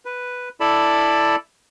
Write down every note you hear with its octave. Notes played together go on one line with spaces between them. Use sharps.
B4
E4 A4 D5 A5 B5